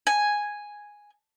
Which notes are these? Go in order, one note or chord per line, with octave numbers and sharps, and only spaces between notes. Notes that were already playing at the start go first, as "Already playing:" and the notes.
G#5